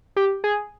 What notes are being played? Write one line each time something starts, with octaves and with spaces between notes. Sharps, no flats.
G4
G#4